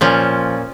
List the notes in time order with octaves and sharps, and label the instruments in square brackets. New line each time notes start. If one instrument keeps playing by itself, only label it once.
[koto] A#2 F3 C#4